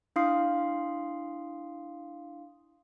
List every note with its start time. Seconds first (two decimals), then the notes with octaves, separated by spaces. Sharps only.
0.16 D4 E4 F5 C6 D#6 C7